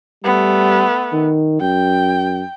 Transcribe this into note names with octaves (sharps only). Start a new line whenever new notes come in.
G3 A3 B3
D#3
F#2 G5